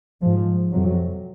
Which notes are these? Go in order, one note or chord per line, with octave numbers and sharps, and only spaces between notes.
G#2 F3
F2 C3 F#3